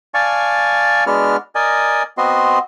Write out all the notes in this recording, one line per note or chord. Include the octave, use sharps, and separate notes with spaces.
D5 F5 G#5 A5 C#6
G#3 B3 D4 F#4 F6
A#4 D5 D#5 G#5
B3 C4 F#4 D#5 C6